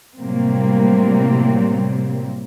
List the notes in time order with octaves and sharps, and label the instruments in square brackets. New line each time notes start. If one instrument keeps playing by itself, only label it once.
[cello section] A2 C3 F#3 G3 A#3 C4